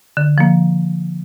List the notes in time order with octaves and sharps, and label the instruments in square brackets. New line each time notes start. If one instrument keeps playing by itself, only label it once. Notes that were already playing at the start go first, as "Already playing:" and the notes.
[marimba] D3
F3 A#3